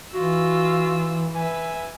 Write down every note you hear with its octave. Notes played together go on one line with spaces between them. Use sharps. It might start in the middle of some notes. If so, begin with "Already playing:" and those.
E3 F4 F#4 E6
B4 E5 G#5